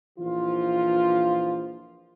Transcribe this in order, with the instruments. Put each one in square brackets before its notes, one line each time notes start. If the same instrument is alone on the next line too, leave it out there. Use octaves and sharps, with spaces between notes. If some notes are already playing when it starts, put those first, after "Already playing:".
[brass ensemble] A#1 E3 F3 F4